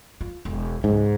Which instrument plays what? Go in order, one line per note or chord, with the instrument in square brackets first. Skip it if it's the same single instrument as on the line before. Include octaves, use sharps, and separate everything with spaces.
[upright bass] F4
E1
[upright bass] C#2 [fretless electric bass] G#2